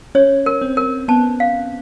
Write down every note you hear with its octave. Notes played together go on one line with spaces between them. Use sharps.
C#4 C#5
A#4
C4
A#4
B3 A5
F5